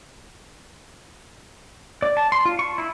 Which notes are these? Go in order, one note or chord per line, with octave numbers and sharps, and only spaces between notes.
D5
A5
C6
F4
C#6
E4